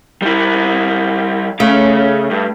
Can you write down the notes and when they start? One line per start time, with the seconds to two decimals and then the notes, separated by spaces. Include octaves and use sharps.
0.22 G3 E4
1.60 C#3 A3 F5
2.31 G2